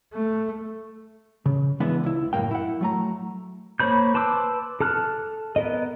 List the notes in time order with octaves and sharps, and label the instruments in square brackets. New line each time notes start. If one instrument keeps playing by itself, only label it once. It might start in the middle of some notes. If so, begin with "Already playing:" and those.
[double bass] A3
[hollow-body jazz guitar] C#3
E3 G#3 B3 D4 E4 B4
C#2 E4
F#2 A2 D#3 A#3 G5
E4 F#5
F#3 A3 A#5
[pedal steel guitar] A#3 C5 C#5 B5 G6
B4 A5 C6 D6 E6
A4 A5 F6 F#6
B3 A#4 D#5